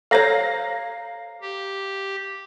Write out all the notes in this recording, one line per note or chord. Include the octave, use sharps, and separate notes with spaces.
A4 C5 C#5 F5 A#5 A#6
G4